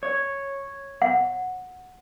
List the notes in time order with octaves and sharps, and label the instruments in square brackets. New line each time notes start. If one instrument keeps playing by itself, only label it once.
[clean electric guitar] C#5
[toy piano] F#5